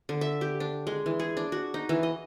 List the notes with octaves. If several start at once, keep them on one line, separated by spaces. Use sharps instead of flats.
D3
E5
G4
D4
G#3
E3
G#4
D4
F#4
D#4
E3
D#5